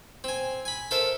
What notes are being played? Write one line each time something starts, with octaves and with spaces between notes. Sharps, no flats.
C4 G#5
G#5 B5
A4 A#4 C5 E5